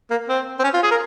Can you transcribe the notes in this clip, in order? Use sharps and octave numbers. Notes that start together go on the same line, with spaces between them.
A#3
C4
C4
C#4
F4
G#4
A#4